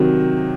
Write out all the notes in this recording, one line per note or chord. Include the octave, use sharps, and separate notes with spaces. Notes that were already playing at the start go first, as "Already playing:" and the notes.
Already playing: C3 D#3 F#3